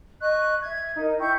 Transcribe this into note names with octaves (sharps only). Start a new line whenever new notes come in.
D#5 C#6 F#6
E5 G#6
D#4 A#4 D#5
E4 G5 C#6 G6